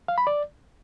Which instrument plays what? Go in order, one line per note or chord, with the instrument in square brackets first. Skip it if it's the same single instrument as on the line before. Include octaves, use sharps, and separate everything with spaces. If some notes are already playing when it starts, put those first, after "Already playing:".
[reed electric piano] F5
B5
D5